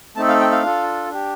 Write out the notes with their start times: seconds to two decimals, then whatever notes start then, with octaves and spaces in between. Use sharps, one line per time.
0.16 A3 C4 D#4 A4 A5
0.28 F5
0.40 G5
0.52 F5
0.63 D4 F4 A4
1.10 D4 G4